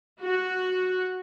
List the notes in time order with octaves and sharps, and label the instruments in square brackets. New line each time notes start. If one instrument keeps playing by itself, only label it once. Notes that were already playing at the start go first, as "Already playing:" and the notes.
[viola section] F#4